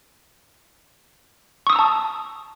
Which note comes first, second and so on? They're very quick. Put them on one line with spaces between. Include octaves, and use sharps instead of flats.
C#6 D#6 E6 A#5 A5